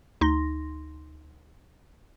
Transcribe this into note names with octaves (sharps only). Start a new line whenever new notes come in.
D2 D#4 C6 A#6